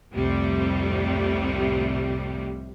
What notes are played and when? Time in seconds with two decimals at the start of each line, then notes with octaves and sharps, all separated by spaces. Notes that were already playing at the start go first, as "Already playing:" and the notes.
0.13 C2 F2 A2 C3 G3